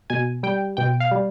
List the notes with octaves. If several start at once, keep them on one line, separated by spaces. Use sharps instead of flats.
B2 G#5
G3 G5
B2 G5
F5
G3